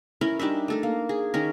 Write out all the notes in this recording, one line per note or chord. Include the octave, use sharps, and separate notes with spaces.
C#4 E4 A#4 B5
G3 D4 D#4 E5
A3 A4 A#4
A#3
G#4
D#3 C#4 A#4